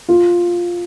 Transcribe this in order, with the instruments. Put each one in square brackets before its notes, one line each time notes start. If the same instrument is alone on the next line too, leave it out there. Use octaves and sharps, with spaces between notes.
[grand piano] F4